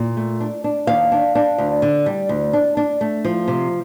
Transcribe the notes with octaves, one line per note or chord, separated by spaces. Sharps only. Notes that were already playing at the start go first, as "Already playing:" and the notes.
Already playing: A#2
A3
D4
D4
D#2 F5
D4
D4
D2
D3
G3
D2
D4
D4
A3
F3
C3